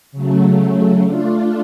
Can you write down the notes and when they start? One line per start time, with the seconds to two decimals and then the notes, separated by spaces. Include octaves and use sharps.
0.12 C#3 F#3 A3
1.02 A3 D4 F4